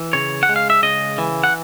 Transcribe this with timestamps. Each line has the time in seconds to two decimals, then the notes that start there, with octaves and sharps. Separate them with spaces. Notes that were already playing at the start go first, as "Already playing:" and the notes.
Already playing: E3
0.13 C#3 C#5
0.43 F#5
0.49 G#3
0.56 F5
0.70 E5
0.82 C#3 D#5
1.18 E3
1.44 F#5